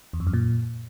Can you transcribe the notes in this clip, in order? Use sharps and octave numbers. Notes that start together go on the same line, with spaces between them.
E2
F2
F#2
A#2